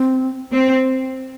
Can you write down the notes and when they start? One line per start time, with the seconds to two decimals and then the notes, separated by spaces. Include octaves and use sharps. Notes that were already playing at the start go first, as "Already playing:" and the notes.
Already playing: C4
0.53 C4